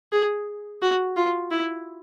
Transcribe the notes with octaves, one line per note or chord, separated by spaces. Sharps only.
G#4
F#4
F4
E4